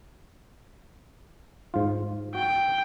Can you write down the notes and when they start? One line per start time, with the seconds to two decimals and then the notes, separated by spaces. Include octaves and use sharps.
1.74 G#2 F4
2.35 F#4 G5